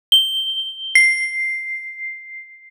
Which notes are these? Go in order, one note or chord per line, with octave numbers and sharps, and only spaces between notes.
G7
C7